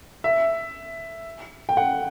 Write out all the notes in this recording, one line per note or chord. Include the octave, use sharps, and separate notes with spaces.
E5
G5
F#5